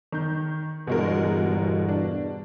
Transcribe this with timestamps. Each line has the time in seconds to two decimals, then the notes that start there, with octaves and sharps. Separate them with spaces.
0.12 D#3 G6
0.87 G1 E2 G2 B2 G#3 A#4
1.89 D4